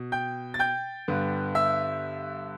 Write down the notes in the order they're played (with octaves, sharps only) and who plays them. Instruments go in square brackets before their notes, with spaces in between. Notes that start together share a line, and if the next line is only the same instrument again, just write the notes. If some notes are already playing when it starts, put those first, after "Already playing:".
Already playing: [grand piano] B2
G5 G6
A6
G5 G6
G2 D3 B3
E5 E6